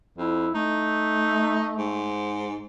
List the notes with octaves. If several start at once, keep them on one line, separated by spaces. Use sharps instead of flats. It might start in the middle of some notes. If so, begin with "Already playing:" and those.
F2 E4
A3 D#4
G#2